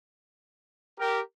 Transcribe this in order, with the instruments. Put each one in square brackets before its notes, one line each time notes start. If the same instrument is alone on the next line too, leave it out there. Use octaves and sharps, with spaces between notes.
[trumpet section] G4 A#4